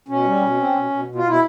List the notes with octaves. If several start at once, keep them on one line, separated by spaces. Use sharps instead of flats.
B2 C#4
G3
B2
C4
B2
B2
B2
F4
B2 E4